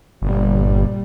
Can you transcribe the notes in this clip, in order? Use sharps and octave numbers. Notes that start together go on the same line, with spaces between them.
G1 A#2 G3